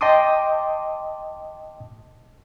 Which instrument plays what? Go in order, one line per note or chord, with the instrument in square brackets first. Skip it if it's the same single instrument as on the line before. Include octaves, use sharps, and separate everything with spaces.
[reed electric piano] D#5 G5 A5 C6 D6 D#6